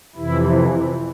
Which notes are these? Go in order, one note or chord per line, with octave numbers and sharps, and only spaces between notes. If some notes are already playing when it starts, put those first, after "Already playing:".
F2 C3 E3 E4